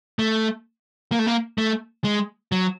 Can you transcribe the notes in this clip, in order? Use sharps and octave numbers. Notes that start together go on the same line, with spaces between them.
A3
A#3
A3
A#3
A3
G#3
F#3